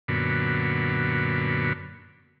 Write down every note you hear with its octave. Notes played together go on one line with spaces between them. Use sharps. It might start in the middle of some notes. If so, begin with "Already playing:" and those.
F#2 A#2 D3 B3